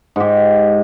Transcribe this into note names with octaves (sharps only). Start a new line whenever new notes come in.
G#2 G4